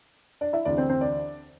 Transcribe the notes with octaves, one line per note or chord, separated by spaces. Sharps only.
D4 D5
E4 E5
D2 C3 E3 D4 D5
C4 C5
C4 C5
D4 D5